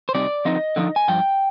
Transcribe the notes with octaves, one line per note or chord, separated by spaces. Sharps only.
C5
C3 G3 C4 D#4 D5
D3 F3 C4 D#4 D#5
D3 F3 C4 D#4
G#5
G2 F3 G5